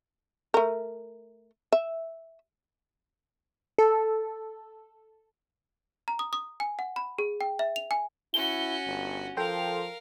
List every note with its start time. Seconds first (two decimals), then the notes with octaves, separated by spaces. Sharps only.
0.54 A3 A#4
1.72 E5
3.78 A4
6.08 A#5
6.19 D#6
6.33 D#6
6.60 G#5
6.79 F#5
6.96 B5
7.19 G#4
7.41 G5
7.59 E5
7.76 F7
7.91 G#5
8.34 C#4 E4 F#4 G7
8.87 G1
9.37 F3 A4 A#4 F5 G5 C6